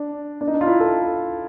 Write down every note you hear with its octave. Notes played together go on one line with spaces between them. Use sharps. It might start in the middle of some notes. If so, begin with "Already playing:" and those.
Already playing: D4
D4
D#4
D4
F4
E4
A4